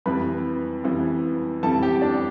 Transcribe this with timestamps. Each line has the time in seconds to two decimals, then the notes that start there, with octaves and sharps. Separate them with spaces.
0.06 F2 E3 G3 B4 B5
0.84 F2 E3 G3
1.63 F2 E3 G3 A4 A5
1.83 G4 G5
2.02 D4 D5